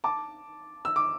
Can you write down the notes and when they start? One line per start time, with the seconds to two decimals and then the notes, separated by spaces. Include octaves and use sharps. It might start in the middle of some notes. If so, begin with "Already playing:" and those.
0.04 A5 D6
0.85 E6
0.96 D6